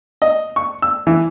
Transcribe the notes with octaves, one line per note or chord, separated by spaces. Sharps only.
D#5
C#6
E6
E3